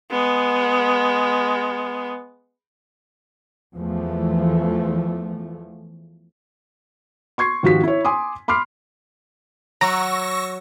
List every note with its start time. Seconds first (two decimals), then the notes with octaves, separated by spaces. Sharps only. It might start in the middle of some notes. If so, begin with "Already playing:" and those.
0.11 G#3 B3
3.73 E2 E3 F3 A3
7.38 C6 C#6 G#6 C7
7.63 G#1 F3 F#4 G4 B6
7.84 E4 C#5
8.05 G#5 C6 D6 D#6
8.48 B5 C6 D6 F6 C7
9.81 F#3 A#5 C#6 E6 A#6